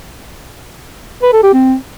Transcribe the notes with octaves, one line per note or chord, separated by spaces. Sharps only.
B4
A4
G4
C4